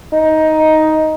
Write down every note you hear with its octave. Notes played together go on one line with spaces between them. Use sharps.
D#4